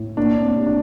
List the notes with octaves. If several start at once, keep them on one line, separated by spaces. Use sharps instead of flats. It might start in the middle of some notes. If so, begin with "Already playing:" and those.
Already playing: A2
A#3 D4
C4
C3
D4